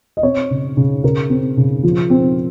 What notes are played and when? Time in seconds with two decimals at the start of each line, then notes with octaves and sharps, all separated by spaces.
0.17 D#5
0.23 C4 C#5
0.50 C#3
0.77 C#3
1.04 C#3 A#4
1.30 C4
1.57 C#3
1.83 F3
2.10 C4